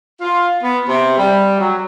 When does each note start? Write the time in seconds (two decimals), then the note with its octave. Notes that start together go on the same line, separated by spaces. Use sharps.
0.21 F4
0.62 B3
0.88 C3
1.18 G3
1.59 F#3